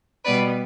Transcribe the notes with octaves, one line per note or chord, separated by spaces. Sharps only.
B2 G3 B3 B4 D5